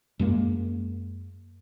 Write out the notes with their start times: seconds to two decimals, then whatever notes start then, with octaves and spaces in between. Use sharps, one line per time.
0.19 F#2 G#3 A#3